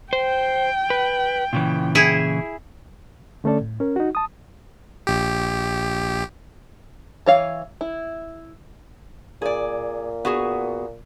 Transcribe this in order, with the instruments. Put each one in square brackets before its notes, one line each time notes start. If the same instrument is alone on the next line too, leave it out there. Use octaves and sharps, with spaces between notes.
[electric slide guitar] C5 [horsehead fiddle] G5
[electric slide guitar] B4
A#2 C#3 E3
[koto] E4 G#4
[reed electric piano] D3 A3 C#4 A4 D5
A2
C#4 A#4
D#4 F#4
A5 D#6
[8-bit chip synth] A#1 G4
[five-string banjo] E3 C#5 F5
E4
[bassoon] A#2 [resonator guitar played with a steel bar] G#4 D5
[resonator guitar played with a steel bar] B3 F#4 G#4